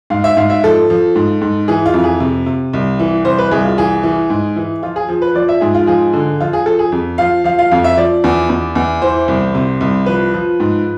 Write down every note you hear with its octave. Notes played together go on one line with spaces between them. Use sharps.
G#2 F5
E5
G#2 F5
E5
F3 A4
F3
G#2
G#2
E3 G#4
F4
F2
G#4
C3
C3
C2
E3
C2 C5
B4
C2 G#4
F4
E3 G#4
E3
G#2
E3
F3 F4
G#4
F3
B4
F3 D5
E5
G#2 G#4
F4
F3 G#4
D3
F3 F4
G#4
F3 A4
G#4
F2
F3 F5
F3 F5
F5
F2 F5
E5
F3 D5
E2
E2
E2
E3 C5
C2
C3
C2
F3 B4
F3
G#2